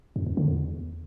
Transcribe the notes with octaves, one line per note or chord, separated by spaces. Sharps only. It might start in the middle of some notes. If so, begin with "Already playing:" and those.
F#2
E2
D3
E2